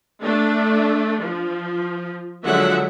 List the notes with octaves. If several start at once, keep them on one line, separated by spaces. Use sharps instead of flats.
A3 D4
F3
D3 F3 F#3 G#3 E5 F#5